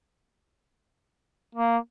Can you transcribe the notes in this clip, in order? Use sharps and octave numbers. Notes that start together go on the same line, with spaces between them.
A#3